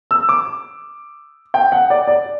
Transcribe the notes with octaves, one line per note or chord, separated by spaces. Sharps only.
E6
D6
G5
F#5
D5
D5